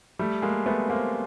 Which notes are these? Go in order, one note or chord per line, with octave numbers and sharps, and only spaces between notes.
G3 A3
G#3 A#3
A3 B3
A#3 C4